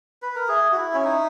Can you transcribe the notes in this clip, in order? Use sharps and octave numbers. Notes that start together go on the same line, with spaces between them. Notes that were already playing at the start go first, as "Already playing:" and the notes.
B4
A#4
G#4 E5
F#4
E4
C#4
D#4